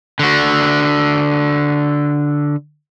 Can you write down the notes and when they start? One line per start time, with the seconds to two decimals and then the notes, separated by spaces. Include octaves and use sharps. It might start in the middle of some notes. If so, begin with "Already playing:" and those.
0.19 D3 F#4